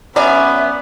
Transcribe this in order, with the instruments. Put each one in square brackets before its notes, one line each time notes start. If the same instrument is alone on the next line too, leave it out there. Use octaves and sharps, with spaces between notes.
[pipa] F#3 C#4 [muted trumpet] B3 [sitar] D5 [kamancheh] E5